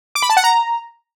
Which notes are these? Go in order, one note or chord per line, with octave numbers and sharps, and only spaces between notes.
D6
B5
A5
F#5
A#5